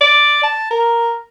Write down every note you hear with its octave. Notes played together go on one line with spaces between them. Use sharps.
D5
A5
A#4